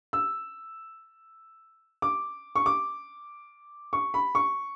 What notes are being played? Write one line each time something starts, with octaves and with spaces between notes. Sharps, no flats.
E6
D6
C#6
D6
C#6
B5
C#6